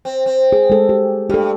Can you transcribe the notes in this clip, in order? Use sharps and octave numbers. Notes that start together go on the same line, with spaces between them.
C4
C4
G#4
G#3 A4
G4
G2 G4 A4